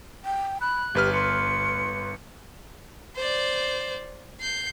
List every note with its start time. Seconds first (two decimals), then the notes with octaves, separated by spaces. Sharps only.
0.25 G5
0.61 B5 F#6
0.95 G1 G4 B4 F6
1.13 C6 C#7
3.16 C5 D5
4.40 G6 C7